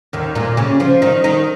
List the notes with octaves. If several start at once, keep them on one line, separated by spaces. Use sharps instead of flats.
D#2 D#3
A#2 A#3
C#3 C#4
F3 F4
D#3 D#4
D#3 D#4